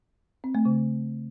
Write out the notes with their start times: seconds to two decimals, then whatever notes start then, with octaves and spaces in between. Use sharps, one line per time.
0.44 C4
0.55 A3
0.65 C#3